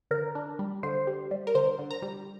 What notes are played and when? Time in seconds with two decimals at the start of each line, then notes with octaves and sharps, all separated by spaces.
0.11 D3 A#4
0.35 D4
0.59 G3
0.83 D3 C5
1.07 G3
1.31 G3
1.47 A#4
1.55 D3 C5
1.79 D3
1.91 A#5
2.02 G3